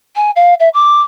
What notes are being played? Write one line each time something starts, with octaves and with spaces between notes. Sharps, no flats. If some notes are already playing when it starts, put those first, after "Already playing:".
G#5
F5
E5
D6